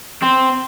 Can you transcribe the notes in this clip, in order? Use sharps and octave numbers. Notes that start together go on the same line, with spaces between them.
C4